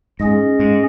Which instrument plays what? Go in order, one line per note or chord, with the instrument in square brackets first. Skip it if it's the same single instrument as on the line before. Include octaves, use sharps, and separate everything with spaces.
[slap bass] G#2 [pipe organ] C#4 G#4 D#5
[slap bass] G#2